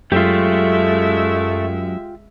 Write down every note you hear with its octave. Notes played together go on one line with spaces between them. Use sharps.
F#2 G#3 A3 F4 G4 E5